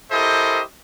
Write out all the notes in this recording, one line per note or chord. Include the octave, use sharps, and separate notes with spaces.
E4 G4 A4 A#4 C5 D#5